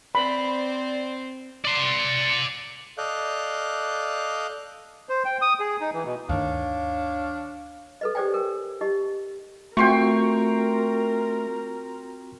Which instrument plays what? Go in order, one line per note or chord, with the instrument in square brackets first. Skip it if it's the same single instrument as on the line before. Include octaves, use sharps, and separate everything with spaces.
[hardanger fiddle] C4 C5 [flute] D5 [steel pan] B5
[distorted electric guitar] D5 C6
[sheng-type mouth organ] A4 D5 D#5 F5 F#6 G6
[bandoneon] C5
G5
D#6
G#4
D#4
E3
B2
[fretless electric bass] D2 G2 D#3 [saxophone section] D4 C#5 F5
[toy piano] A4 B4 D#5
G4 A4 C5 D5 G5 G#5
A4 A#4
D#4 G4 D#5
[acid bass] A3 [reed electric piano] C4 F4 F#4 [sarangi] A#4 [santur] G5 C6 C#6